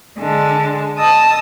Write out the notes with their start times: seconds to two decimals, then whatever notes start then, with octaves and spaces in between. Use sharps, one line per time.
0.18 D3 G#3 A5
0.98 D#5 A5 D#6 E6